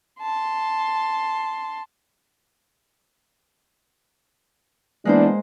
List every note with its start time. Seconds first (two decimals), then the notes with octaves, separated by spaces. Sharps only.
0.23 A5 C6
5.05 E3 G#3 A#3 B3 D4 C5